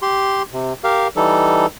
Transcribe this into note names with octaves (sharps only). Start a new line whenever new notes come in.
G4 C6
C3
G4 A#4 F5
E3 G3 D#4 A4